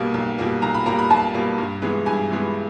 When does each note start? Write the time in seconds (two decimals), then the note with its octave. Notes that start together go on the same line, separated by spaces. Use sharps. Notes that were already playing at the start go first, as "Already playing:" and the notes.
Already playing: B1 B2 G3 A#3
0.14 B1
0.38 B2 G3 A#3
0.62 B1 A#5
0.74 B5
0.86 B2 G3 A#3 A#5
0.99 B5
1.10 B1 A5
1.34 B2 G3 A#3
1.58 G2
1.82 E3 G#3 B3
2.06 G2 G#5
2.30 E3 G#3 B3